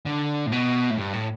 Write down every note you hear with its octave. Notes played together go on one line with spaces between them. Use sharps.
D3
A2
B2
A2
G2
A2